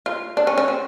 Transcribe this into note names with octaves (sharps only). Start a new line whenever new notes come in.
F4
D4
C#4
C#4
C4